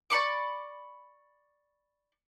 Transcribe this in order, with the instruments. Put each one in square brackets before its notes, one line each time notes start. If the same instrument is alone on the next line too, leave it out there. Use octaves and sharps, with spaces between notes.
[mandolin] D5 B5 C#6 D6